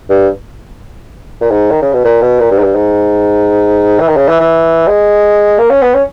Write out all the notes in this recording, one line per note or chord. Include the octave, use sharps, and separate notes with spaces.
G2
A#2
G#2
D#3
C#3
B2
A#2
B2
A#2
G2
G#2
G2
G#2
E3
D#3
C#3
E3
E3
G#3
A#3
C#4
B3
C#4